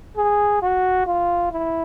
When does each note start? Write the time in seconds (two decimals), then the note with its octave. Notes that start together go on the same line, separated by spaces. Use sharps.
0.17 G#4
0.62 F#4
1.07 F4
1.52 E4